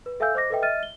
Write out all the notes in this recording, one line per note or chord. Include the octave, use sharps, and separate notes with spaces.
B4
A4 E5 F5 G#5 E6 G6
C5 D#5 D6 A#6
A4 B4 D#5 E5 G5
D#5 E5 F6 A6 D#7
G7